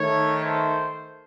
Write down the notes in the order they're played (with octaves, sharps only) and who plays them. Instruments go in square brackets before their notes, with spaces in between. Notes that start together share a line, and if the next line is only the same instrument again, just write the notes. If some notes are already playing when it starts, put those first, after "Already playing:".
Already playing: [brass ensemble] D#3 A3 C#5
C5